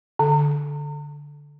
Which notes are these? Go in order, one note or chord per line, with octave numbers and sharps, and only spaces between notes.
D3